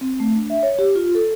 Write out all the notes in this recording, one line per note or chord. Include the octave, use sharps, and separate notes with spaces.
C4
A3
D4
E5
C#5
G4
F4
A4